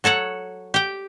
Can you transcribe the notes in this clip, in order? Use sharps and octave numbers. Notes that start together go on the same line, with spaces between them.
F#3 A4 C#5 F#5
G4 G5